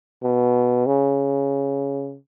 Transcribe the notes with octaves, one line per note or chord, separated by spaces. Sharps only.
B2
C#3